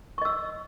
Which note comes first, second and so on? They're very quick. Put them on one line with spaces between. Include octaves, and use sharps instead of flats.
C#6 D#5 E6